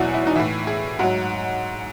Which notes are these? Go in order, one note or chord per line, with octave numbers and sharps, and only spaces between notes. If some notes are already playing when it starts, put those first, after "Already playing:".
Already playing: E2 B2 F#3 E4 F#4
E4
D#4
A2 E3 E4
G#4
G#2 F#3 F#4